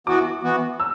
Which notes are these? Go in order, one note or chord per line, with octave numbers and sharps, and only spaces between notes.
E3 B3 F#4 D6
E3 B3 F#4
E6